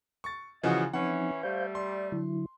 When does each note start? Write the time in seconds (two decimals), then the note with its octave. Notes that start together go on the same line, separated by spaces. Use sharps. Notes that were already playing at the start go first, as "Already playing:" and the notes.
0.24 C#6 A6
0.63 C#3 E3 F3 F#4 D#5
0.93 E3 F3 C4 C#4 D#4 C#5 F#5
1.43 G3 A3 C5 F5 G6
1.75 D5 C6
2.12 D3 F#3 E4